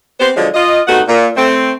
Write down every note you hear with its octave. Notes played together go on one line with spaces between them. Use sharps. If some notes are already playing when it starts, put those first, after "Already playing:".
B3 C4 G4 C5
D3 F3 F#3 G#3
F4 D#5
C3 A3 B3 D#4 F#4 F#5
A#2
A3 C4